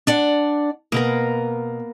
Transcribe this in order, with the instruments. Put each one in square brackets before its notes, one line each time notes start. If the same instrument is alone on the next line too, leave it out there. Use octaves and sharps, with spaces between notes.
[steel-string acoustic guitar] D4 D5 F#5
[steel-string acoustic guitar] B2 [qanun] A#3 B3 A#4